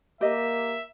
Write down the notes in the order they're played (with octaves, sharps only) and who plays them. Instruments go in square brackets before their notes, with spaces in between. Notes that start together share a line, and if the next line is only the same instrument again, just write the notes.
[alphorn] A#3 [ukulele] G4 D#5 [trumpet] E5